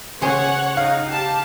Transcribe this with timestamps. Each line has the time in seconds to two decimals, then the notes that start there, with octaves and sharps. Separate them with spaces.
0.21 C#3 G#4 C5 C#5 F#5
0.77 D#4 F5
1.08 G4 A5